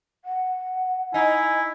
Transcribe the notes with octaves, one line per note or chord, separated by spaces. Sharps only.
F#5
D#4 E4 G#5